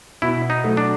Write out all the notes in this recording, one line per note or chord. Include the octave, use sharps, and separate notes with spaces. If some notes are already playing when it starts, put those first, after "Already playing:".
B2 E4
D#4
F#3 A3
D4